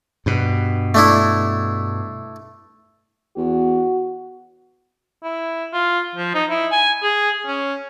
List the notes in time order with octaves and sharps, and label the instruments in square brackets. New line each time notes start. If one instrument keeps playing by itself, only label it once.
[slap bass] G2 B2
[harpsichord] A3 D4 E4
[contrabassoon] E2 [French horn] F#4
[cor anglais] E4
F4
F3
D#4
E4
G#5
G#4
C#4